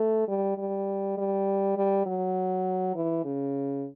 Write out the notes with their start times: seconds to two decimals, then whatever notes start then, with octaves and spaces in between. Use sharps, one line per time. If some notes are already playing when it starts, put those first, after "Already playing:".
Already playing: A3
0.28 G3
0.58 G3
1.17 G3
1.77 G3
2.06 F#3
2.95 E3
3.25 C#3